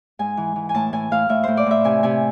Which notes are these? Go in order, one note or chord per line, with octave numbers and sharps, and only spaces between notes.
G#2 G#5
E3
E3
G#5
A2 A5
A2 G#5
A2 F5
A2 E5
A2 C5
D5
A2 E5
C3 G#5
C3 G#5